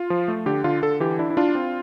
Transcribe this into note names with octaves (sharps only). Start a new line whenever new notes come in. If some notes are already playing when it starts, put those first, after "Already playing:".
Already playing: F4
F3
A3
D3 G4
D3 F4
D3 A4
E3 G4
D4 E4
E4
D4 F4
C4